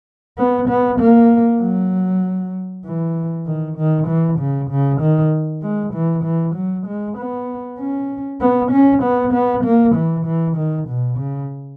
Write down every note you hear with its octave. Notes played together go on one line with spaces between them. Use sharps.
B3
B3
A#3
F#3
E3
D#3
D#3
E3
C#3
C#3
D#3
G#3
E3
E3
F#3
G#3
B3
C#4
B3
C#4
B3
B3
A#3
E3
E3
D#3
B2
C#3